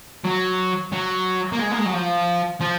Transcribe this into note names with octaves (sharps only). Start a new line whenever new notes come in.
F#3
F#3
A#3
G#3
A#3
G#3
F#3
F3
F3